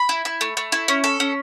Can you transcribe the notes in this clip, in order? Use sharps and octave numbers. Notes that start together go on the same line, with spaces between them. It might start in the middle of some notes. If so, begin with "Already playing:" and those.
Already playing: B5
E4
E4
A3
A3
E4
C#4
A4
C#4